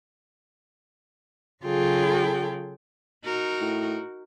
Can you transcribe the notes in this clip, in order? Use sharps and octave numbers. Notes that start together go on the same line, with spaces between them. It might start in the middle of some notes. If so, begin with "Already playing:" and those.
C#3 F#3 F4 G#4 A4 G5
D#4 F#4 A#4
A2